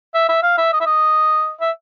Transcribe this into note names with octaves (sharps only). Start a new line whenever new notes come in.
E5
E5
F5
E5
D#5
E5
D#5
E5